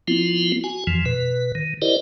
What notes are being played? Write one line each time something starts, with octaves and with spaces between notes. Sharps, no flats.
F3 B3 C4 E4 F4
F#4 G#5
F2 E3 F3
B2 B4
D#3
E4 G4 A#4 C5 D5 D#5